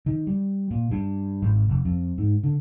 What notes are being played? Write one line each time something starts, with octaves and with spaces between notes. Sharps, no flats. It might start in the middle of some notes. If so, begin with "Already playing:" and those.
D#3
G3
A#2
G2
G#1
F1
F2
G#2
D3